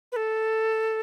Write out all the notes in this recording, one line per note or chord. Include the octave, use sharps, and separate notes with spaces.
B4
A4